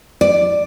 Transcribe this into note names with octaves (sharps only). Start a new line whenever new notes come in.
D5